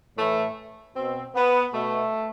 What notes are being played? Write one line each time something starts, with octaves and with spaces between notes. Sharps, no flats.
A2 E3 A3
B2 C4
B3
B2 A3